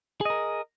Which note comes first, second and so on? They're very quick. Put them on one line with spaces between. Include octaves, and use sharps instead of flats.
G#4 D#5 A#4